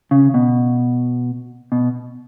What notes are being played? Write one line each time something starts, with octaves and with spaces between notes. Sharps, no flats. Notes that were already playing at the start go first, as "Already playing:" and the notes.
C#3
B2
B2